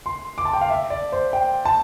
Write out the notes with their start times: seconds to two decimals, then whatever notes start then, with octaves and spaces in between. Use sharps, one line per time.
0.06 C6
0.38 D6
0.45 A5
0.53 G5
0.61 F5
0.70 E5
0.90 D5
1.12 C5
1.33 G5
1.65 A5